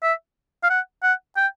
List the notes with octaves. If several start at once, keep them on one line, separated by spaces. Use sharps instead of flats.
E5
F5
F#5
F#5
G5